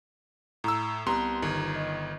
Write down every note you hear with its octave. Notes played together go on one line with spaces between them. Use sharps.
A2 A#5 E6
C2 B3 G4 B4 A#5 C6
G1 D#3
D#5